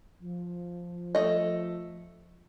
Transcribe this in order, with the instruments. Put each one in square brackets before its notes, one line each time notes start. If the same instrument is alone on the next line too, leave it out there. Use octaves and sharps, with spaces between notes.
[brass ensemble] F3
[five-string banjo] A3 D#5